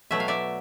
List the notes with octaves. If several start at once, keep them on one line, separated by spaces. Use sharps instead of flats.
B2 F#3 A3 E5
F5
D5 E5